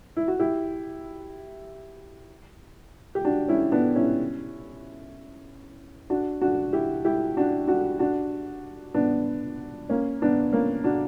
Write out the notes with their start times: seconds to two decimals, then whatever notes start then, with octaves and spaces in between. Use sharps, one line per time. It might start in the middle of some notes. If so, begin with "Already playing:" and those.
0.17 E4
0.28 F#4
0.39 E4 G4
3.15 G4
3.25 D4 F#4
3.48 C#4 E4
3.72 B3 D4
3.96 C#4 E4
6.10 D4 F#4
6.41 D4 F#4
6.73 E4 G4
7.04 E4 G4
7.37 D4 F#4
7.68 D4 F#4
7.99 D4 F#4
8.94 B3 D4
9.89 A#3 C#4
10.22 B3 D4
10.53 A#3 C#4
10.84 D4 F#4